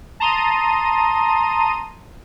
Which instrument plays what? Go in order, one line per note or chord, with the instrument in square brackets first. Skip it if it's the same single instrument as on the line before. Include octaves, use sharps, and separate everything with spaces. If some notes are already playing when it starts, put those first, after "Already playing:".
[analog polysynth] A5 A#5 C6 D#6 D#7